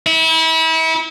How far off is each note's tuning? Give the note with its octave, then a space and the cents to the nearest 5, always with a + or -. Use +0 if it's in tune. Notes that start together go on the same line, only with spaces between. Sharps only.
E4 -35